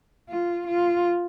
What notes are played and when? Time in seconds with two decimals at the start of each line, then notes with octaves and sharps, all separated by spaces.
0.29 F4
0.67 F4